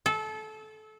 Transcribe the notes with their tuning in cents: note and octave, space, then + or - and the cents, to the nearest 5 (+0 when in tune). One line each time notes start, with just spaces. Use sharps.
A4 -25